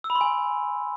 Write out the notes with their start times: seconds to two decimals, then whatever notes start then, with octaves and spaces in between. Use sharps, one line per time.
0.04 E6
0.10 B5
0.15 C6
0.21 G#5